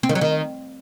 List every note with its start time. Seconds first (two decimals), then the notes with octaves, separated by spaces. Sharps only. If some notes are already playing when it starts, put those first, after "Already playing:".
0.03 C4
0.09 D#3
0.15 F#3
0.21 D#3